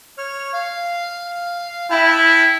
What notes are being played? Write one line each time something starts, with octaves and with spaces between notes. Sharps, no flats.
C#5 F6
F5
E4 G5 A5 F6